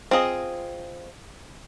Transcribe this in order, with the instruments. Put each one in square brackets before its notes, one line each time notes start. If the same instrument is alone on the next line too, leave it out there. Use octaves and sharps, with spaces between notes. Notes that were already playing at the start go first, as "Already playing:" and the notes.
[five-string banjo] C4 F4 G#4 D#5